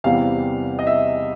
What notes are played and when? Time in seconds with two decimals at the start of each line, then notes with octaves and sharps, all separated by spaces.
0.04 E2 C3 E3 G3 B3 F5
0.79 D#5
0.87 E5